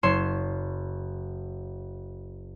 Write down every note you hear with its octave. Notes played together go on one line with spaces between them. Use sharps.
F#1 C#5 C6 E7